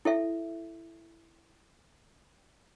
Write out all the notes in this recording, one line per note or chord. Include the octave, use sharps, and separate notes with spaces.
E4 A4 E5